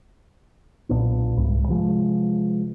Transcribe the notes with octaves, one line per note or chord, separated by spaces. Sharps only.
B1 A#2 B3 D4
C2 G#2
C3 E3 F3 G#3